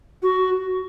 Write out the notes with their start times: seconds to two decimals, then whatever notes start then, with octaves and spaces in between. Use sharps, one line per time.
0.22 F#4